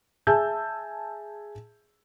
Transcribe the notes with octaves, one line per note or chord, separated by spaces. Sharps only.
G#4 E5 G#5 A5 E6 G6